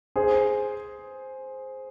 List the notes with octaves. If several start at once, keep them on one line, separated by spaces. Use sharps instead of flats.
G#4 C5